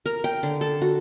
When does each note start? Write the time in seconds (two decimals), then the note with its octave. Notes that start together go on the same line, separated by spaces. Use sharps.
0.06 A#4
0.24 G5
0.43 D3
0.61 A4
0.82 F#4